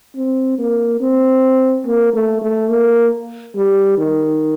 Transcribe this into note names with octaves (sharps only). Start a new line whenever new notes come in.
C4
A#3
C4
A#3
A3
A3
A#3
G3
D#3